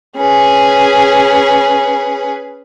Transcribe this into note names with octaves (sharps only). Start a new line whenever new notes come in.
C#4 G#4 B4